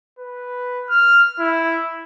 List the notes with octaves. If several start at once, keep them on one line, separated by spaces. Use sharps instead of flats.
B4
F6
E4